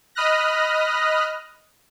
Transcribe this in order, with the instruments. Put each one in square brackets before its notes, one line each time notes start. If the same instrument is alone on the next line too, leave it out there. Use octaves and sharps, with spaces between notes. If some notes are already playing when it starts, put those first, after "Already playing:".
[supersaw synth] D#5 B5 D#6 F6 F#6 A#6